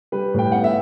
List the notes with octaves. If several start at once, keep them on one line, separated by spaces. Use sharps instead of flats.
G3 B4
A2 G5
B3 F#5
E5